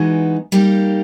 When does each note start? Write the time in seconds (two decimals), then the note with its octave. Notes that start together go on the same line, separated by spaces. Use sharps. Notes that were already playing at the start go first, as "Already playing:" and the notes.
Already playing: E3 G#3 B3 D#4 F#4
0.52 G3 A#3 D#4 G4